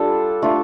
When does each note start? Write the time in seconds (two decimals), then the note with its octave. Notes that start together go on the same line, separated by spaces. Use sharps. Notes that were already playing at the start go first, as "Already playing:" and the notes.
Already playing: G3 D4 F4 A4
0.42 A3 D4 F4